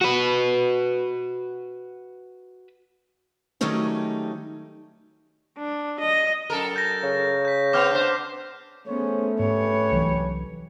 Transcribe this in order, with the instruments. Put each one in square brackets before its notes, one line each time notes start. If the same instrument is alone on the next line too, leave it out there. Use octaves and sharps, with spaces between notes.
[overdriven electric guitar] F#4 B4
[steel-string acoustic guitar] D#3 F#3 G3 A3 C#4 D#4
[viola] D4
D#5
[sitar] F#2 A4 A#4
[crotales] G6 A#6
[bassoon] C#3
[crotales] G6 B6
[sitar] B3 C4 [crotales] D6 F6 G6
[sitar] D4 C5 [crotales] G6
[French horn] A3 [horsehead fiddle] B3 C#4 [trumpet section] G#4 C5 C#5
[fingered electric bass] G#2 [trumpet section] C#4 G4 B4 [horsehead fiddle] C#5
[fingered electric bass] C2 E3 F#3